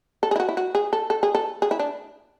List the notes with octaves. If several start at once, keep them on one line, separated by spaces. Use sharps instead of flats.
A4
G#4
E4
F#4
E4
F#4
G#4
A4
A4
G#4
A4
G#4
E4
D4